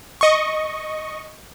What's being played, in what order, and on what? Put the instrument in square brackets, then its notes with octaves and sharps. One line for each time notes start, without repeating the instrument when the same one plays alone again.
[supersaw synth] D#5 C#6